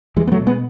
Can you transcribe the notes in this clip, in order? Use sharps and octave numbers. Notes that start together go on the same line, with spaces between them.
E2 E3 G#3
B3
F#3 A3
B2
G#3 B3